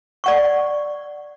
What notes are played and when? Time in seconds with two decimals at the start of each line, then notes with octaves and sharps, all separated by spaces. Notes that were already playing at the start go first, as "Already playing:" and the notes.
0.24 D5 F#5 C#6